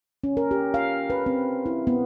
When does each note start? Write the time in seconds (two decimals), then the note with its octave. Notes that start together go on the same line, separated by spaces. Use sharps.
0.24 C#4
0.37 A#4
0.51 G4
0.74 F5
1.10 B4
1.26 C4
1.66 E4
1.87 B3